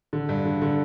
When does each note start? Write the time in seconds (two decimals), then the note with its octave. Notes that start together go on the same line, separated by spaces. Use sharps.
0.13 D3
0.29 G2
0.45 D3
0.62 D3